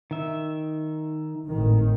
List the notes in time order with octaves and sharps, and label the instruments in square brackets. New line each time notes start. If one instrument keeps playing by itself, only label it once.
[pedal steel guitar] D#3 E5
[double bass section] G#1 A2 D#3